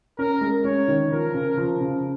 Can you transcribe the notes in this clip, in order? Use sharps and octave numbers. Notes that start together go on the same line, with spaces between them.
C#4 A#4
G#3
C#4 C#5
D#3
F3 A#4
C#3
F3
C#3